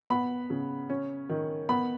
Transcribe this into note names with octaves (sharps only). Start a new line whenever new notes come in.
B3 B5
C#3
C#4
D#3
B3 B5